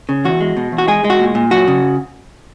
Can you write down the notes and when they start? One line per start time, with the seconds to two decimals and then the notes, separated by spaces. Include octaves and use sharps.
0.09 C#3
0.25 E2 F#4
0.40 G#3
0.57 B2
0.72 E2
0.78 F#4
0.88 G#3 G#4
1.04 G#3
1.10 F#4
1.20 A#2
1.35 A#2
1.51 F#2 F#4
1.68 C#3